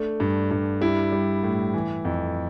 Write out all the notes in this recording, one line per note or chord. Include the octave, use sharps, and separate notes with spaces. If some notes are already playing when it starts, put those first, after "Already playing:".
Already playing: A3 D4
G2
G2
G3 E4
G3
A2
E3
F2